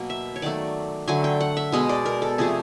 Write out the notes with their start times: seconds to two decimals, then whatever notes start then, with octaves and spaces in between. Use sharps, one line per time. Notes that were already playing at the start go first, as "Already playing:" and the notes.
Already playing: B2 F#3 A#3
0.10 E5
0.36 C#5
0.42 D#3 F#3 A3 D5
1.08 D3 F#3 A3 G#5
1.24 G5
1.40 F#5
1.57 E5
1.72 B2 G#3 B3 D#5
1.89 D5
2.06 A#4
2.22 A4
2.38 C3 F3 A3 G#4